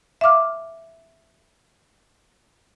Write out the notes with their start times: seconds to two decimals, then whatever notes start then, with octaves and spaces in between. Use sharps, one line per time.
0.21 E5 F5 D6 F6